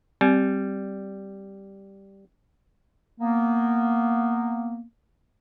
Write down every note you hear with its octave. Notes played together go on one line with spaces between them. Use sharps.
G3 C4
A#3 B3